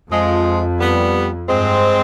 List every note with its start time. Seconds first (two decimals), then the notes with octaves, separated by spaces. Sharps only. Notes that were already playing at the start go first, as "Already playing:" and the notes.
0.11 F2 F3 G#3
0.80 G3 B3
1.49 G2 G#3 C4